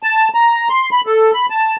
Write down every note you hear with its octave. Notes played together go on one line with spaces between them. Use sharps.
A5
A#5
C6
B5
A4
B5
A5